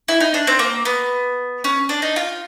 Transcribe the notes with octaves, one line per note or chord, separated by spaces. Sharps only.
E4
D#4
D4
C4
A#3
B3
C#4
D4
D#4
F4